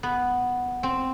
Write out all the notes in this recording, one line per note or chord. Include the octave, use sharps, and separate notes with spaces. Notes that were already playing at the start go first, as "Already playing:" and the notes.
B3
C4